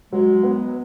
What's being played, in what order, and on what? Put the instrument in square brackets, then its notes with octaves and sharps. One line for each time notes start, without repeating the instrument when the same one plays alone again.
[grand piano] F#3 [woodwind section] G#3
[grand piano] B3
[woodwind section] F#3